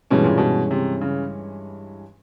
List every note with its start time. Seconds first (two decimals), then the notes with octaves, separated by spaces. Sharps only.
0.10 G2 B2 E3 G#3 C#4
0.24 A#2
0.38 B2
0.71 C3
1.01 C#3